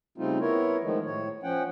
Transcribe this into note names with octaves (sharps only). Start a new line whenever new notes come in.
C#3 G3 A3 C4 D#4 F4
B3 E4 A#4 C#5
D#3 F3 G#3 A3
A2 C#5
F3 C#4 F#5 G5